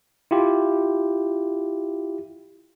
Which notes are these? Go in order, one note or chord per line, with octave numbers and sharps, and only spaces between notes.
E4 F4 G4